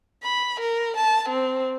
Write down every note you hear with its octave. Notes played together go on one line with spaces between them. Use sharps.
B5
A#4
A5
C4